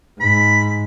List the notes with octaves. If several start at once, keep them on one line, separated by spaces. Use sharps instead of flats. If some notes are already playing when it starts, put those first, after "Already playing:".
G#2 B5